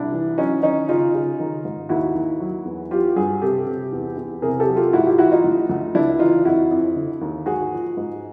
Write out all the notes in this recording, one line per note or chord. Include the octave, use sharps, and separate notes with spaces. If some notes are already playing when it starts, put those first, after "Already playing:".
Already playing: C2 D4 E4
E3
F#3 C#4 D#4
D#3 C#4 D#4
C#3 D#4 F4
C#3
D#3
G#2
D#2 E4 F#4
D#2
F#3
E2
F#3 F4 G4
G2 F#4 G#4
C3 G4 A4
C3
E2
E2
C3 G#4 A#4
G4 A4
F#3
F4 G4
G#2 E4 F#4
F4 G4
E3 E4 F#4
D#4 F4
D2
D2
C#2 D4 E4
E3 D#4 F4
F2 E4 F#4
F2
D3
D#2
G#2 F#4 G#4
F3
G#2